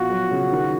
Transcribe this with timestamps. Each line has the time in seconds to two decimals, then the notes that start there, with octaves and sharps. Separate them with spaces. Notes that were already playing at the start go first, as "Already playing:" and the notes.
Already playing: A#1 B3 F4 F#4
0.10 F#3
0.31 C#3
0.52 D#3